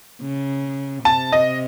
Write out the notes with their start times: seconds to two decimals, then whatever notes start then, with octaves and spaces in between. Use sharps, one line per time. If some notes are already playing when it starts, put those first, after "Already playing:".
0.22 C#3
1.05 C3 A5
1.32 D#5